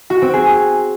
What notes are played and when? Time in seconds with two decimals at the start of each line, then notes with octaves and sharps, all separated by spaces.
0.10 F#4
0.22 C4
0.34 G#4